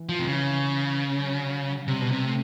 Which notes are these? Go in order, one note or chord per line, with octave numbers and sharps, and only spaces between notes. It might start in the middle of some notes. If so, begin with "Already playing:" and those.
Already playing: E3
F3
C3
C#3
F#3
C3 G3
B2
C3
A3